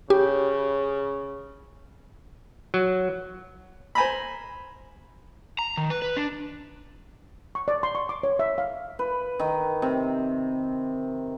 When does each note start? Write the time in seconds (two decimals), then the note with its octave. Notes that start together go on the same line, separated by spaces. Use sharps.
0.10 C#3 G4
2.74 F#3
3.95 C5 G#5 A#5 B5
5.59 A#5
5.77 D#3
5.90 B4
6.02 B4
6.17 D4
7.55 C#6
7.68 D5
7.83 C6
7.95 C#6
8.09 D6
8.23 C#5
8.39 E5
8.58 F5
8.99 B4
9.39 D#3
9.82 C3